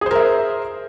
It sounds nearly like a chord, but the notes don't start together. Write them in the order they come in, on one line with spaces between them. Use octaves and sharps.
G#4 C5 A#4 E5